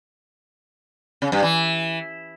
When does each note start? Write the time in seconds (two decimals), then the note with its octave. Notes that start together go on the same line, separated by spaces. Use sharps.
1.22 C#3
1.32 G2
1.43 E3